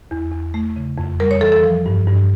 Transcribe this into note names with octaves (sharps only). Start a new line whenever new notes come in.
E2
E2
A3
C#3
F2
G3 A#4
C#5
E3 A4
A4
F3
G2
G2